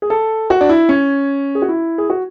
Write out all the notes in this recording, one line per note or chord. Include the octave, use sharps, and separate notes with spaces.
G#4
A4
F#4
D4
E4
C#4
G#4
F#4
E4
G#4
F#4